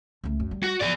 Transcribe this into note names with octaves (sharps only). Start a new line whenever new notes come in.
C#2 A3
F#2
G3
F#4
F3 F#3 G#4 D5